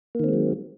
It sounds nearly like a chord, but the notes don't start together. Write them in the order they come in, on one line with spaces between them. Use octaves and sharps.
A#3 D#3 C4 G#3 F#3